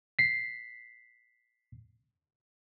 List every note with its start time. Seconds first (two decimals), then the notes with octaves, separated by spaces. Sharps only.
0.19 B6 C7